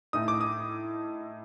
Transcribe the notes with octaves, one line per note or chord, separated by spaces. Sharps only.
A2 A3 D#4 D#6
D6
D#6